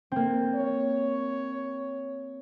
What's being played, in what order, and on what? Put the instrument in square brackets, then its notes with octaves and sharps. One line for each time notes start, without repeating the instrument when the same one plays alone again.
[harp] A#3 C4
[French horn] C#5